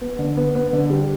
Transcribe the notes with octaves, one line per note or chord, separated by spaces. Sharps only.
B3
D3
B3
B3
D3
G3